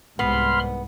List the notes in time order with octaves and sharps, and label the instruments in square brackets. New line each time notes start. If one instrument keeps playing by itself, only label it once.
[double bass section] C2 G#2 [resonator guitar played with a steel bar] B3 [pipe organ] B5 C6 F6